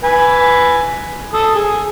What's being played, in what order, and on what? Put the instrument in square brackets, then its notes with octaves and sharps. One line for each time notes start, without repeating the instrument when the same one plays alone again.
[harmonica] B4 G#5 B5
A4 D#6
G#4